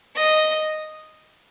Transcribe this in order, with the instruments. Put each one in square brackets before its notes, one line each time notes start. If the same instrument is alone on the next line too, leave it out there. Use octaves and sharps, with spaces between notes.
[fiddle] D#5